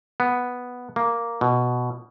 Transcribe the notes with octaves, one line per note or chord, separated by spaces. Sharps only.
B3
A#3
B2